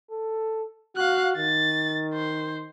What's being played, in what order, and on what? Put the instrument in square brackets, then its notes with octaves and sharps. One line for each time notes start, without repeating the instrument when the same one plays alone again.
[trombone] A4
[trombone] F#4 [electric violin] F5 F#6
[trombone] D#3 [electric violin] A6
[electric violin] C5